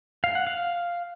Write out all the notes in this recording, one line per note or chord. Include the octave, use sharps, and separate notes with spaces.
F5
F#5
F5